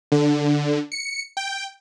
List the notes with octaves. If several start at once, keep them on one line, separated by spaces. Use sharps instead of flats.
D3
C#7
G5